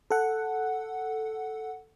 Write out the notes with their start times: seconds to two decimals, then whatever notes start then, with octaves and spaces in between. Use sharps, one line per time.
0.11 A4 F#5